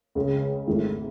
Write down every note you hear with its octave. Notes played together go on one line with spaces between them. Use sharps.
C#2 C#3 G#3
G#1 G#2 D#3 A3 E4